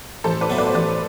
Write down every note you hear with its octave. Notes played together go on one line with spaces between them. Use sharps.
A1 A4 C5
B4 D5
A2 F#3 B3
B4 D5
C5
A1 B4 D5